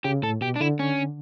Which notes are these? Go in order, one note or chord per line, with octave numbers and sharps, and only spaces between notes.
C#3 G4
A2 A4
B2 G4
D4
D3 E4
C#4